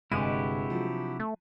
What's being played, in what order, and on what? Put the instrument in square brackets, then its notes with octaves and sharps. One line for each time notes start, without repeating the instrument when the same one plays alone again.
[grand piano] G1 D#7 [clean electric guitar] C3 D4 [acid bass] G#3 [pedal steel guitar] E4 F#4 G4
[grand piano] F3 F#3
[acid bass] A3